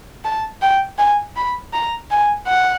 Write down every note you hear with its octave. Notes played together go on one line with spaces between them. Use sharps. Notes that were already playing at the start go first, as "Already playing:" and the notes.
A5
G5
G#5
B5
A#5
G#5
F#5